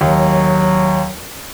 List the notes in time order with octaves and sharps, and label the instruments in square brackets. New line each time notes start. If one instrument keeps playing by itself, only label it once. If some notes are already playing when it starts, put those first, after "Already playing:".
[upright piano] D#2 [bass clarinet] F#3